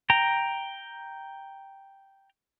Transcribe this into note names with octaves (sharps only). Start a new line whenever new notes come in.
G5 A#5